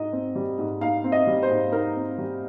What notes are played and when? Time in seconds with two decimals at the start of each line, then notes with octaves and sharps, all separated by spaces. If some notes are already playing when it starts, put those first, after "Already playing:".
Already playing: G#2 D#4 D#5
0.13 C4
0.36 G3
0.59 G#2
0.81 D#4 F5
1.04 C4
1.12 D#5
1.27 G3
1.43 C5
1.50 G#2
1.72 D#4 A#4
1.96 C4
2.18 G3